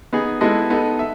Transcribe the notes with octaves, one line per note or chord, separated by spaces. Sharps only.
B3 D#4 G#4
G#3 B3 E4 A4 D#5
B3 D#4 A4
E5